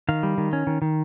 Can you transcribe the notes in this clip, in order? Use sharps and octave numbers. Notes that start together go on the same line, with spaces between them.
D#3 F5
G3
D#3
C#4
D#3
D#3